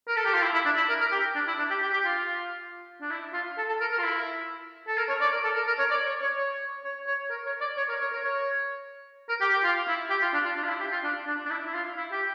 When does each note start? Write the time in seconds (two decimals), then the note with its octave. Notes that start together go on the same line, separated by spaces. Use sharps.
0.08 A#4
0.16 A4
0.25 G4
0.34 F4
0.42 E4
0.54 E4
0.65 D4
0.77 E4
0.89 A#4
1.00 A#4
1.12 G4
1.35 D4
1.47 E4
1.58 D4
1.70 G4
1.82 G4
1.93 G4
2.05 F4
3.01 D4
3.10 E4
3.33 F4
3.57 A4
3.69 A4
3.80 A#4
3.92 A#4
3.99 F4
4.03 E4
4.87 A4
4.97 A#4
5.09 C#5
5.21 D5
5.32 A#4
5.44 A4
5.55 A#4
5.67 A#4
5.79 C#5
5.91 D5
6.06 C#5
6.21 C#5
6.37 C#5
6.84 C#5
7.07 C#5
7.30 A#4
7.46 C#5
7.61 D5
7.77 C#5
7.89 A#4
8.01 C#5
8.12 A#4
8.24 C#5
9.29 A#4
9.41 G4
9.53 G4
9.64 F4
9.88 E4
10.10 G4
10.22 F4
10.34 D4
10.45 F4
10.56 D4
10.63 F4
10.69 E4
10.81 G4
10.92 F4
11.04 D4
11.27 D4
11.45 D4
11.50 E4
11.66 E4
11.74 F4
11.97 E4
12.12 G4